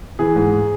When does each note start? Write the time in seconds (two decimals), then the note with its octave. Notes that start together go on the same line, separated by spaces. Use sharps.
0.19 E3 G#4
0.36 G#2